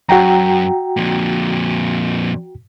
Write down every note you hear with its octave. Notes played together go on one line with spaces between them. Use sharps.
F#2 F#4 G5 A#5
F2 A#2